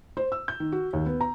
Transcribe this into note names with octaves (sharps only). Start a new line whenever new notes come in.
C5
E6
G6
D#3
F#4
D#2
B3
A#5